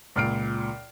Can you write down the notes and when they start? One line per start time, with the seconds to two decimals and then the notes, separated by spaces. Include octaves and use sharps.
0.16 C#2 A#2 F6 C7 D7